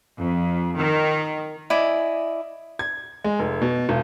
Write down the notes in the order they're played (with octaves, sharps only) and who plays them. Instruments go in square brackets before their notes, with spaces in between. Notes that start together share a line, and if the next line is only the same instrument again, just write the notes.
[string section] F2
D#3
[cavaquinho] E4 D5 D#5 G#5
[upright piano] G#6
G#3
F1
B2
E1